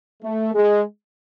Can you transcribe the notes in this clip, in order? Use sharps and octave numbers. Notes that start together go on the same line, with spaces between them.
A3
G#3